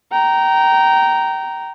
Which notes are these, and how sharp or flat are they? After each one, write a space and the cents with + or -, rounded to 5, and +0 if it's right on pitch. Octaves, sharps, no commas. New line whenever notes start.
G5 -25 A#5 +0